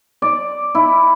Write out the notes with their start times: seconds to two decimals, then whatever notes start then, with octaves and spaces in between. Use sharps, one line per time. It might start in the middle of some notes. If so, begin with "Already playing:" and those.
0.22 D5
0.75 E4